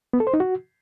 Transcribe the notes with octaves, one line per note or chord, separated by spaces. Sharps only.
B3
A4
C5
D#4
F#4